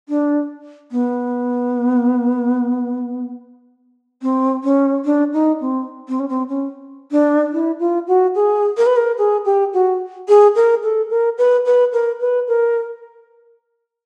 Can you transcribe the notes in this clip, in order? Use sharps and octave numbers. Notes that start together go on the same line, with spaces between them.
D4
B3
C4
C#4
D4
D#4
C4
C4
C#4
C4
C#4
D4
E4
F4
F#4
G#4
A#4
B4
A#4
G#4
G4
F#4
G#4
A#4
A4
A#4
B4
B4
A#4
B4
A#4